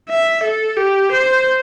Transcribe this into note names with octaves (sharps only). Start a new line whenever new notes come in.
E5
A4
G4
C5